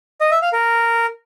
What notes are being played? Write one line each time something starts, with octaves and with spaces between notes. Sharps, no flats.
D#5
E5
F5
A#4